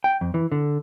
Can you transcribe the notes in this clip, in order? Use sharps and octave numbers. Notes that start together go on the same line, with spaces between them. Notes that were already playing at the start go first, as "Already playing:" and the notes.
G5
F2
E3
D3